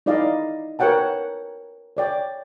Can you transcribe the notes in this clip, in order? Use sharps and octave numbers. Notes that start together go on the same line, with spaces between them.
D#4 E4 D5 D#5 F5
A#4 B4 C#5 F#5 G5 A5
C#5 D5 G5